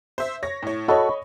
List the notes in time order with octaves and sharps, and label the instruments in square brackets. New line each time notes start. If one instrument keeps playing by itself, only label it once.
[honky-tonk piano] C5 E5
C#5 A#6
A2 C#5
[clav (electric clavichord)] F#4 A4 [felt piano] C#5 D#5 [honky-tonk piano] B5 C#6